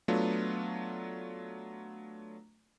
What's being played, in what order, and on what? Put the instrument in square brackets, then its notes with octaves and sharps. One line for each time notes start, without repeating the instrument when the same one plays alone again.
[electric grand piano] F#3 A3 B3 D4 F4